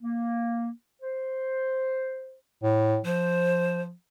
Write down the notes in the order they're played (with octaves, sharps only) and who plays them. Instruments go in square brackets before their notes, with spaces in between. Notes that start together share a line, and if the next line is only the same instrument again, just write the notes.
[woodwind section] A#3
C5
[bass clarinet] A2
[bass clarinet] F3 [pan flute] C5